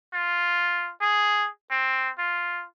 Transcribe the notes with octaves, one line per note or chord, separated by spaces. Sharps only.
F4
G#4
C4
F4